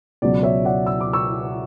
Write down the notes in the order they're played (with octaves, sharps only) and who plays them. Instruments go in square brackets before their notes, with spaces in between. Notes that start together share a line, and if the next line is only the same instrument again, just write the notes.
[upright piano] C#2 B2 F#3 D5
C#5 E5
D5 F#5
E6
D6
C#6 E6